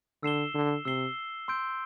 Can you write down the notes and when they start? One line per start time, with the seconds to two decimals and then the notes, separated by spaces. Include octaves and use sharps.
0.23 D3 E6 C7 E7 G7
0.54 D3
0.85 C3 E6 C7 G7
1.48 C6 E6 G6 D7